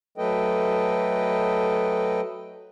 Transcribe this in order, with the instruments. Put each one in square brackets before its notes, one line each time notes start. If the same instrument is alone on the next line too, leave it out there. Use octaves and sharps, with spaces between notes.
[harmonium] F#3 A3 A4 B4 D#5 G5